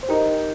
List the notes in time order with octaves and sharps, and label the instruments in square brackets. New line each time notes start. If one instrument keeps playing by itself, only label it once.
[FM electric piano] C5
[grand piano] D#4 [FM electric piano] G4 A#4